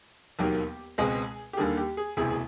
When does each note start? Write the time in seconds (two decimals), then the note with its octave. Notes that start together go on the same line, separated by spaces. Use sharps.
0.39 E1 D#2 D#3 F#3 A#3 G4
0.98 C#2 B2 G#3 C4 G#4
1.53 G4
1.57 D#2 D3 G3 A#3 G#4
1.77 G4
1.97 G#4
2.17 E1 D2 C3 E3 G#4
2.30 G#4